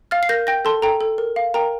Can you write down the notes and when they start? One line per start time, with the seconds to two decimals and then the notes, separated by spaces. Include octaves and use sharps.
0.11 F5 F6 A6
0.23 C7
0.29 A#4 G6 A#6
0.47 G5 G6 A#6
0.65 A4 A5 C6
0.82 A4 G5 A#5
1.01 A4
1.18 A#4
1.36 F5
1.54 A#4 G5 A#5